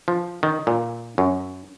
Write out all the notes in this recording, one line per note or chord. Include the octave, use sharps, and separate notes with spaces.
F3
D#3
A#2
F#2